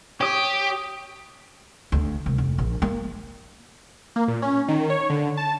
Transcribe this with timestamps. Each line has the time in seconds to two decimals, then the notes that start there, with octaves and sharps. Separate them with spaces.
0.21 G4 C#5 D#6
1.92 D2
2.26 C2
2.38 F1
2.58 A#1
2.82 A#3
4.16 A#3
4.28 A#2
4.42 C#4
4.68 D#3
4.90 C#5
5.10 D3
5.37 A5